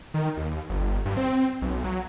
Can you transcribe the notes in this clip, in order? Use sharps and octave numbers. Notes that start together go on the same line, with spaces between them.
D#3
D#2
G1
G2
C4
B1
F#3